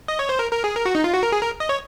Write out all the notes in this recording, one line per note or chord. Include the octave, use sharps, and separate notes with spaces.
D#5
C#5
C5
A#4
A#4
G#4
A#4
F#4
D#4
F4
F#4
A#4
G#4
A#4
D#5
C#5